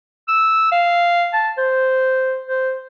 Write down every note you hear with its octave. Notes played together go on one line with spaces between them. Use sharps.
E6
F5
A5
C5
C5